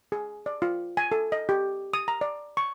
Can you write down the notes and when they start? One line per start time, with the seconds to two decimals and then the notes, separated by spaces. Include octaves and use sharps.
0.12 G#4
0.46 D5
0.62 F4
0.97 G#5
1.12 A4
1.32 D#5
1.49 G4
1.94 D#6
2.08 A#5
2.21 D5
2.57 C#6